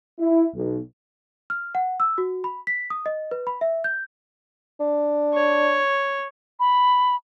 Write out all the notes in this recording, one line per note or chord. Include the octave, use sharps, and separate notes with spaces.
E4
B1
F6
F#5
E6
F#4
B5
B6
D#6
D#5
B4
B5
E5
G6
D4
C#5
B5